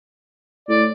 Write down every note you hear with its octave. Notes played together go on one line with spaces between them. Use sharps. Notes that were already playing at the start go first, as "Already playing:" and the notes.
A2 D5